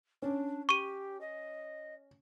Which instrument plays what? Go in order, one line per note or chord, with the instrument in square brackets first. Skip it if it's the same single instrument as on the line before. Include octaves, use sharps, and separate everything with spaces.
[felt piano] C#4 [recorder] D4
[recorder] G4 [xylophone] C#6 D#7
[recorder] D#5